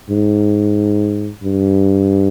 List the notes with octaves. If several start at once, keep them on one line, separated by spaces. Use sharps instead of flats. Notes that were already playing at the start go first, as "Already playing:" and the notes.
G#2
G2